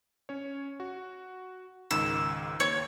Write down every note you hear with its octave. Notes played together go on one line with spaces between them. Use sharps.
C#4 C#5
F#4
C#2 G#2 D#3 E6
D#2 C#5